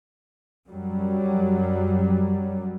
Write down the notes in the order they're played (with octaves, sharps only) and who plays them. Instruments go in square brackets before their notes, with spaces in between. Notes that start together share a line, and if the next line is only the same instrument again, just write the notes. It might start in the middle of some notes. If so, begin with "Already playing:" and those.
[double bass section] F#2 F#3 G3